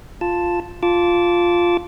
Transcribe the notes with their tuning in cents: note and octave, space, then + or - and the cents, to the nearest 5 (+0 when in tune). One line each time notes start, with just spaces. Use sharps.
F4 +0 A5 +0
F4 +0 A5 -5 D6 -20